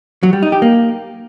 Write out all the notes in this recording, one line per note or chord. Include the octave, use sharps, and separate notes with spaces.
F#3
G3
D#4
G4
A#3